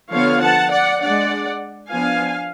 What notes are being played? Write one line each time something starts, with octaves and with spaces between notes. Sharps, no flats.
D3 F3 B3 C#5 F5
F#5 A5
D5 F#5
G#3 D4 D5 F#5
F3 B3 D4 F5 G#5